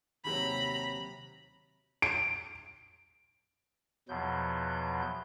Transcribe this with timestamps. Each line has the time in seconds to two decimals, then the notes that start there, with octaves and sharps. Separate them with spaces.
0.24 D#2 C3 F#3 A#5 B5
2.02 D7
4.09 E2 B2 F3 F#3 G6